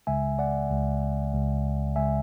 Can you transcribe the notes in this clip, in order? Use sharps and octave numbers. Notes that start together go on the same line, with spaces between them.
C#2 C#3 G#3 E5 G#5
D5 F#5
C#2 C#3 G#3
C#2 C#3 G#3
C#2 C#3 G#3 E5 G#5